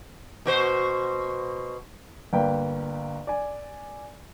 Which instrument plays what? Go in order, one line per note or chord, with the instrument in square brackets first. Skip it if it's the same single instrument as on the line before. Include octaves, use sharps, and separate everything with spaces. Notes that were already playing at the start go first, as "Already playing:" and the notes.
[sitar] B2 F#4 C5
[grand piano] G1 A#3 B4 G5
D5 G#5